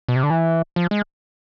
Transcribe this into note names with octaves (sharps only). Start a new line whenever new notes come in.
B2
C3
D3
E3
F3
G#3